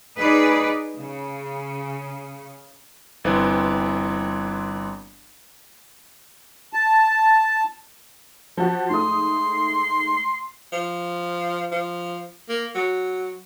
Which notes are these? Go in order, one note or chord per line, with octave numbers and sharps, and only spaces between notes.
D#4 G#4 B4 D5
C#3
G1 E3 C4
A5
F3 F#4
G#2 A3 C6 D#6
F3
F3
A#3
F#3